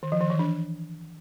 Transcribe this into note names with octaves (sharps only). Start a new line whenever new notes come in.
D#3
F3
D#3
E3
D4